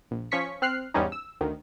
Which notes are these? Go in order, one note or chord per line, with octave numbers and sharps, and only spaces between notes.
A#1
F3 C#4 C#6 B6 C#7
C4 F6 F#6 C7
E2 G#2 G3 C#4 D#4
E6
D2 D#3